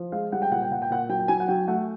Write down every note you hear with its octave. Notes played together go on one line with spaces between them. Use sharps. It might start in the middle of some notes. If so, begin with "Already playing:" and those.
Already playing: F3
G#3 F5
G3 F#5
G5
A#2 F#5
G5
A#2 F#5
G5
A#2 F#5
F#3 G5
G5
F#3 G#5
F#5
F#3 G5
A3 F#5